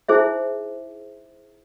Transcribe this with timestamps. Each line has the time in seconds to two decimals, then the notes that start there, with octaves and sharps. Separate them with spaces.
0.08 D#4 E4 G#4 C5 E5